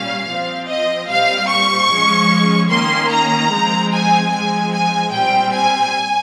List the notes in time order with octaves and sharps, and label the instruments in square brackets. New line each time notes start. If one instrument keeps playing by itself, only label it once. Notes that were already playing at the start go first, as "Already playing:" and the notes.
Already playing: [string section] A#2 G3 C#4 F5
F3 C4
D#5
A#2 G3 C4 F5
C#6
F3 G#3 C#4
D#3 A#3 C#4 C6
A#5
F3 G#3 C4
G#5
F3 G#3 C4 G#5
G#5
A#2 G3 C4 G5
G#5